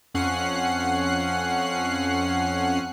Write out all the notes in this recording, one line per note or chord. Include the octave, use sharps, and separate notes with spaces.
F2 C#4 F#5 F#6 C7